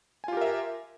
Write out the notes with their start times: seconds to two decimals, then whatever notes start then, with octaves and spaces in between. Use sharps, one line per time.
0.24 G#5
0.28 F4
0.33 G4
0.37 A#4
0.41 E5